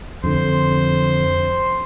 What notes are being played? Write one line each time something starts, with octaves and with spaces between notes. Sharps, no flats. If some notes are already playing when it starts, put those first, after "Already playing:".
F2 D3 C5